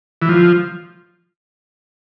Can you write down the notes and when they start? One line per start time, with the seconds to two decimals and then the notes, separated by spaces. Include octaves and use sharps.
0.22 E3
0.29 F3